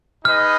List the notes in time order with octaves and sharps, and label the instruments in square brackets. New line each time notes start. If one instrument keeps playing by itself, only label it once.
[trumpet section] D#4 G#4 B4 D#5 [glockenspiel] F6